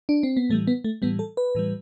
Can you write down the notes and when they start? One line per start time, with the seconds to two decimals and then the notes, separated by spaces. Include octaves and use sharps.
0.09 D4
0.23 C4
0.37 B3
0.49 A2 E3 G3 A3
0.67 B3
0.84 A3
1.02 A2 E3 G3 B3
1.19 A4
1.37 B4
1.55 A2 E3 G3